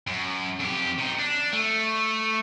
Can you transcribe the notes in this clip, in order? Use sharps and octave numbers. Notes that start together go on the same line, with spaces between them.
F#2
F2 G4
C3 D#4
D4
A3